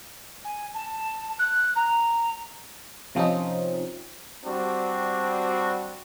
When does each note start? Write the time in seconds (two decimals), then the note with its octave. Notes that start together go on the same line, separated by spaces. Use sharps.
0.44 G#5
0.74 A5
1.39 F#6
1.75 A#5
3.15 C3 F3 C4 C#4 D#4
4.44 G3 C4 D4 F#4